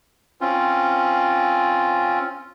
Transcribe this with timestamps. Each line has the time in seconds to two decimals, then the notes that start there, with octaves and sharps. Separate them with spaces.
0.41 C4 C#4 F4